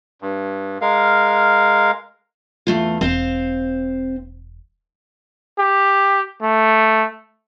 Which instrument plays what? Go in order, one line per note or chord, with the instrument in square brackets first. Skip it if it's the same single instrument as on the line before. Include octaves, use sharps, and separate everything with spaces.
[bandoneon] G2
G#3 A#4 F5
[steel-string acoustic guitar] E2 A3 F4
[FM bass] E1 [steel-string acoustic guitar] C4 C5 F5
[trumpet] G4
A3